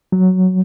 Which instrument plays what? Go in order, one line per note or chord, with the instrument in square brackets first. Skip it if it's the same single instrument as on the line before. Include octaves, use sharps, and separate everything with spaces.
[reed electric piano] F#3